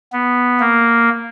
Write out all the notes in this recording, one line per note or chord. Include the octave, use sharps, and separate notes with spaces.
B3
A#3